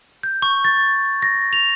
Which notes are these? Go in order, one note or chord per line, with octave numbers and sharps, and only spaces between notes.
G6
C#6
A6
A#6
F7